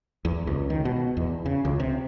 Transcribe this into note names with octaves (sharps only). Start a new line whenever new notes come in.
E2
C#2
D#3
B2
E2
C#3
C#2
C3